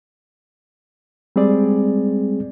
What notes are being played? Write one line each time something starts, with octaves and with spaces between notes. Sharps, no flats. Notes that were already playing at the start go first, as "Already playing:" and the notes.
G3 G#3 C4 G#4 D5